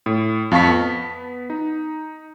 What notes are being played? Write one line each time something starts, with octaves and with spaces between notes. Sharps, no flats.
A2
F2 F5 A5 C#6 B6
B3
D#4